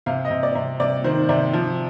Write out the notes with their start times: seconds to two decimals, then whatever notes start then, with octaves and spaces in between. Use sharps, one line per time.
0.06 C3 F5
0.25 D#5
0.31 C3
0.43 D5
0.55 C3
0.80 C3 D5
1.04 D#3 C5
1.29 C3 D5
1.53 F3